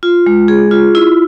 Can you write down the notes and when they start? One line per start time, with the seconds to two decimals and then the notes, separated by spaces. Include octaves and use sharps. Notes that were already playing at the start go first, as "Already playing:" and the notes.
0.03 F4
0.26 G#3
0.48 G#4
0.71 F4
0.95 E4